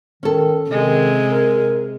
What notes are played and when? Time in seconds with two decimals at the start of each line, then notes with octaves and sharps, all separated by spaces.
0.23 D#3 C#4 A4
0.71 C3 D#3 G#3
1.31 A#4